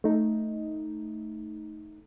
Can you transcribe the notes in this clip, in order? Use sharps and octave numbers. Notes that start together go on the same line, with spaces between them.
A3 D#4